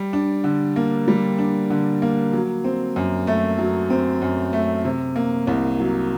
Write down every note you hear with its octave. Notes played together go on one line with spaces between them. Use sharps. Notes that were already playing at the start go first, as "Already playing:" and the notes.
Already playing: G3
D4
D3
A#3
G3
D4
D3
A#3
F#3
C4
F#2
A3
F#3
C4
F#2
A3
C3
A#3
C2
F#3